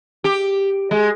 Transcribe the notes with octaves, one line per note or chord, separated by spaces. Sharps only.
G4
G#3